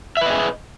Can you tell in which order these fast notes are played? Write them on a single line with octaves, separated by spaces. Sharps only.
E5 B4 D#5 G#4